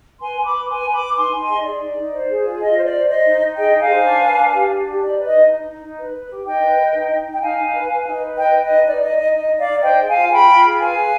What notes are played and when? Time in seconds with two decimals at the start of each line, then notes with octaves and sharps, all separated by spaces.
0.20 B4 G#5 C6
0.36 B4
0.44 B5 D6
0.52 B4
0.68 B4 G#5 C6
0.84 B4
0.93 B5 D6
1.00 B4
1.16 D#4 G#5 C6
1.32 D#4
1.41 G#5 C6
1.48 G#4
1.53 D#5
1.64 G#4 D5
1.81 D#4
1.97 D#4
2.13 C5
2.29 G#4
2.45 F4
2.61 F4 D#5
2.77 C5
2.85 D5
2.93 C5
3.09 C5 D#5
3.25 D#4
3.41 D#4
3.57 G#4 D#5 G5
3.73 D#4
3.81 F5 G#5
3.89 C5
4.05 D4
4.22 B4
4.37 D4
4.53 G4
4.70 D4
4.86 G4
5.02 D#4 D5
5.18 B4
5.26 D#5
5.34 D#4
5.50 D#4
5.66 D#4
5.82 D#4
5.98 B4
6.14 B4
6.30 G4
6.46 D#4 D#5 G5
6.62 B4
6.78 B4
6.94 D#4
7.10 D#4
7.26 D#4
7.32 G5
7.42 D#4 F5 G#5
7.58 D#4
7.74 B4
7.90 B4
8.07 D#4
8.22 B4
8.38 B4 D#5 G5
8.55 B4
8.63 D#5
8.71 D#4
8.87 D#4 D5
9.02 D#4 D#5
9.19 D#4 D#5
9.35 D#4 D#5
9.51 D#4
9.59 D5 F5
9.67 D#4
9.83 C5 D#5 G5
9.99 G#4
10.07 F5 G#5
10.15 F4
10.31 G#4 G5 B5
10.47 F4
10.63 G#4
10.79 B4 F5 G#5
10.95 B4